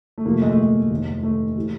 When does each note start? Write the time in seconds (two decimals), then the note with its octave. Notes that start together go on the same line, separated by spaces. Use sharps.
0.18 A3
0.25 F1 E2 C3 F3 A#3
0.33 A3
0.42 G#3
0.50 A3
0.58 G#3
0.91 F1 D#2 D#3
1.23 A3
1.57 C3 E3